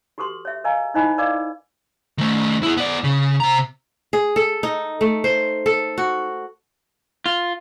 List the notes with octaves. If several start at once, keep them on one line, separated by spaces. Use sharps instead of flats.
F#4 G4 A4 B4 C6
C#5 E5
A#4 D#5 F5 G#5 A#5
D#4 E4 C5 D#5 G#5 B5
A#4 B4 D5 D#5 F5 D6
D#3 A3
E4 G#4
B3 D5
C#3
C3 A#5
G#4
A4
D#4
A3
C5
A4
F#4
F4